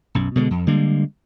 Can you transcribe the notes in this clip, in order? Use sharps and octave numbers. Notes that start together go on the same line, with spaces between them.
B1 F#2
B2 D3 E3 G#3
F2
D3 G3 G#3 A#3